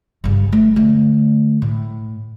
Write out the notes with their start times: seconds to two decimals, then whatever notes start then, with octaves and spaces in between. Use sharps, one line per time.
0.24 G1 C#3
0.52 A3
0.76 D3 A3
1.62 A2